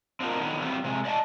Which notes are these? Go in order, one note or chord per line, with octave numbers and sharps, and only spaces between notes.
C4 D4 D#4 F4 F#4 A#4
D3 D#3 F#3 B3
E3 F#3 G3 B3 C4
C3 G#3
D5 D#5 G#5 A5